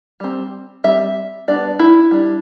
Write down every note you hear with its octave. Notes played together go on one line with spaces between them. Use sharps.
G3 C4
G3 C4 E5
G3 B3 D4 D5
E4
G3 D4